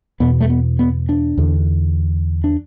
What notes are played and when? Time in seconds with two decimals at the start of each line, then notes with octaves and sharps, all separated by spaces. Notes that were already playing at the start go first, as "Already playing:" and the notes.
0.20 E2 B2 B3
0.40 A3
0.50 B3
0.79 B3
1.09 D4
1.38 E2 D3
2.44 D4